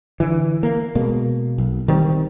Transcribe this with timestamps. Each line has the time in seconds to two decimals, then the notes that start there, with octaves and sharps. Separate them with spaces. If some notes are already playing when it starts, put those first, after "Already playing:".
0.20 D3 E3
0.63 A#3
0.95 B2 G#3 A#3
1.58 B1
1.88 D#3 G3 C4